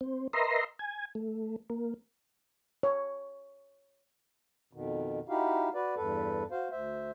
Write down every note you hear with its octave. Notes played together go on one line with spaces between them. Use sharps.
C4
A#4 B4 D#5 E5 A#5 C6
G#5
A3
A#3
C#5
F2 B2 D#3
D#4 E4 F#4 G4 F5
F#4 B4 D5
E2 G2 A4 B4
F#4 C5 F5
D2 C5 E5